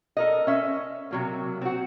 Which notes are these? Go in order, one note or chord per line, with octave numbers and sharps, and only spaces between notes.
A4 A#4 D#5
C#4 E5
C3 F#3 A#3
C4 F#4